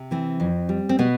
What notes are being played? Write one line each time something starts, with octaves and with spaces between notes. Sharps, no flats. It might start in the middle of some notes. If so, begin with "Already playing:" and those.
Already playing: C3
E3 C4
F2
G3
C4
B2 B3